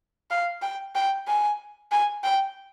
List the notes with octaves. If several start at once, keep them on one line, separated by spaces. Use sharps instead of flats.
F5
G5
G5
G#5
G#5
G5